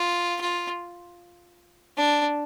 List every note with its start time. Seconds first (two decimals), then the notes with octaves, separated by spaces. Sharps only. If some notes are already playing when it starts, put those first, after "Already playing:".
Already playing: F4
0.41 F4
1.97 D4